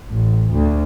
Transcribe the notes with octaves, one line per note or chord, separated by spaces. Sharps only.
A1
D2